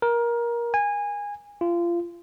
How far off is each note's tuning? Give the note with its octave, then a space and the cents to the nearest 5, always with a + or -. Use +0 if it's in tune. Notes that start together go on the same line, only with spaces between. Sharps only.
A#4 +20
G#5 -20
F4 -25